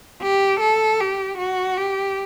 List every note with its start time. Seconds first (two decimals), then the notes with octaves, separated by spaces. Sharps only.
0.22 G4
0.60 A4
1.00 G4
1.38 F#4
1.77 G4